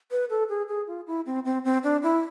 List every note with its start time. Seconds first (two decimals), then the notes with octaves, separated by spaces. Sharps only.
0.11 B4
0.30 A4
0.49 G#4
0.68 G#4
0.87 F4
1.07 E4
1.26 C4
1.45 C4
1.65 C4
1.84 D4
2.03 E4